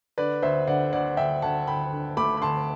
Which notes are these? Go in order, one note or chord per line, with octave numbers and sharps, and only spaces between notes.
D3 B4 D5
D2 C5 E5
D3 D5 F#5
D2 D5 F#5
D2 E5 G5
D2 F#5 A5
D2 G5 B5
D3
A3 B5 D6
B5
D2 A5 C6